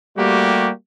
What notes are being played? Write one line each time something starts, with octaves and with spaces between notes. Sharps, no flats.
G3 A3 A#3 F#4 G4